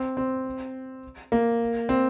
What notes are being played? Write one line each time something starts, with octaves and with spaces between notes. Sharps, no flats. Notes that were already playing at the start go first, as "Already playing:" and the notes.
Already playing: C4
C4
A#3
C4